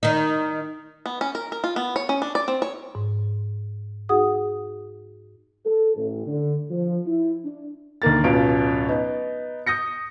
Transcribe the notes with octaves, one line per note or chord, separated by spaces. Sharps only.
D#3 D#4
B3
C#4
A#4
A#4
F4
B3
C#5
C#4
D4
D5
C4
C#5
G#2
D#4 F#4 G#4 F#5 D#6
A4
A1
D3
F3
E4
D4
D2 D#3 A#3 A6
D1 B2 C#4 F4 D7
B3 D#4
D#6 G6 A#6 C#7